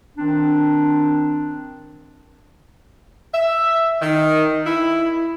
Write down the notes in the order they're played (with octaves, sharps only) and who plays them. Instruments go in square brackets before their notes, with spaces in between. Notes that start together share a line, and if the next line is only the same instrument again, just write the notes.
[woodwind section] D#3 C4 D4
[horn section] E5
D#3
E4